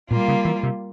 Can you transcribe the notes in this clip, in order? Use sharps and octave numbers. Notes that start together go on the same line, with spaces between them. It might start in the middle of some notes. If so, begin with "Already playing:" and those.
A#2 G3 A#3 F4
C#3
E3
C3